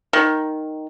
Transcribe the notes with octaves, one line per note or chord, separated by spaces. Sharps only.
D#3